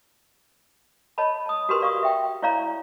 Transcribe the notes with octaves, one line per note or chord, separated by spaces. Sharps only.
C#5 D#5 A5 B5
A5 D#6
F#4 G4 A#4 B4 C6
D5 F5 C#6 D#6
E5 G5
E4 C#5 D5 F5 A#5